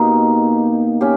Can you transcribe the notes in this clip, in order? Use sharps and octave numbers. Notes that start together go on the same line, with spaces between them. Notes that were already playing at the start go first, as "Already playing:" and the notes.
Already playing: B2 A#3 D#4 G4
C#4 G4